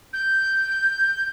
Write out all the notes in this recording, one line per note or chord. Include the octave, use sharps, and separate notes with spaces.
G6